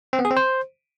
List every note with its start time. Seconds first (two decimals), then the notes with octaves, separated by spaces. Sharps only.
0.13 C4
0.19 B3
0.25 G#4
0.31 C4
0.37 C5